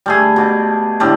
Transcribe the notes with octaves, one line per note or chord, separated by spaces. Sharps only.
G3 A3 G#4
B2 D6
A2 D3 G3 A3